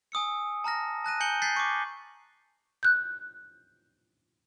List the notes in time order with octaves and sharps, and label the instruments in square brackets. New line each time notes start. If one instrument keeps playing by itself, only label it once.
[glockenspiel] G#5 D#6 E6 C#7
A5 A#5 F6 A#6
A5 F#6 A#6 D#7
G#5 G6 C#7 F#7 G7
G6 A6 B6 C7
C#6 D6
[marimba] F#6 G6